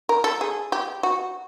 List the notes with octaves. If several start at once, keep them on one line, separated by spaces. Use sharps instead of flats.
A#4
A4
G#4
G4
F#4